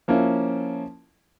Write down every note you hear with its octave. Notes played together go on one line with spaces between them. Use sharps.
F3 A#3 C#4 E4